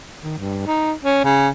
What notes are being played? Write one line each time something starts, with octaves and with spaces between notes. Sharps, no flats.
D#3
G2
D#4
C#4
C#3